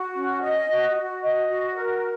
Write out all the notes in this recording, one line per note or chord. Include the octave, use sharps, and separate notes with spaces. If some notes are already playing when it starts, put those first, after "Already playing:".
Already playing: F#4
C#4
D#5
F#4
F#4
D#5
F#4
A#4